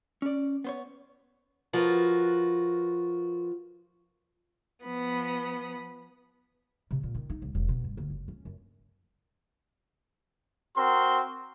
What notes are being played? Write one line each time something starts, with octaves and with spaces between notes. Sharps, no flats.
C#4 D5
B3 C5 C#5
F3 F4 F#4 A#4 B4
F3 B3 B5 D#6
C3
A#2
D#3
D#4
C2
E1
B2
G2
D2
F#1
C#4
F#2
C4 F#4 A#4 C6